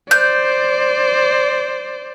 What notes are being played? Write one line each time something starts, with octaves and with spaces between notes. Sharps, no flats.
C5 D5 G6